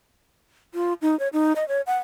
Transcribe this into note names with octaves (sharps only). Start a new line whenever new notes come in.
F4
D#4
C#5
D#4
D#5
C#5
F#5